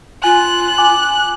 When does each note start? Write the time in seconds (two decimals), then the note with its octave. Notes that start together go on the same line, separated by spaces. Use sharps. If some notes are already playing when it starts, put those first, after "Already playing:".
0.24 F4 G#5 F#6
0.78 G#5 D6